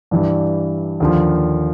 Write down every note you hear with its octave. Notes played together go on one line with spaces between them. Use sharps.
G2 E3 G3
D#2 D3 F3